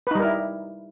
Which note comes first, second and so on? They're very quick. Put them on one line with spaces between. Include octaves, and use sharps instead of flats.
B4 D#4 G3 A#4 E4